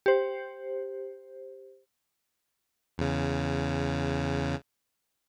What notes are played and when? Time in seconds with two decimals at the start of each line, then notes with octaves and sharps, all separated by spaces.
0.06 G4 C5
2.98 E2 C#3